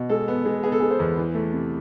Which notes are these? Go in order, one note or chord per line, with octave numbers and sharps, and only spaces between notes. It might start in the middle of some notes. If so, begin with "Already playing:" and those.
Already playing: B2
G#3 A4
B3
G#3
B3 G#4
A4
G#3 G#4
C5
E2
E3
A3
C3